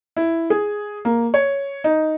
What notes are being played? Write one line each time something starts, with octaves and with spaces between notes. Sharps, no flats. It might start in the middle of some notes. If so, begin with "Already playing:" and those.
E4
G#4
A#3
C#5
D#4